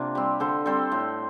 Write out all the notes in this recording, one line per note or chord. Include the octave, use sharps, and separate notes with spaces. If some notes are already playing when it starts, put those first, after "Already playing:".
Already playing: C3 A#3 D4 F4
G3 C4
D3 A4 C5
G3 C4 A4 C5
A2